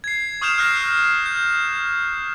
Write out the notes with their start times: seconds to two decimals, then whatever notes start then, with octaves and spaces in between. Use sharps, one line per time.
0.04 G#6 C7
0.41 C#6 D#6 F6 G6 E7 F7
0.58 F6 F#6 A#6 C7 E7
1.26 G6